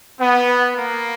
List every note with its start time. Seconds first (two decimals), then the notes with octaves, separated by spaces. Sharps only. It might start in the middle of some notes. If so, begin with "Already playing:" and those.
0.20 B3
0.75 A#3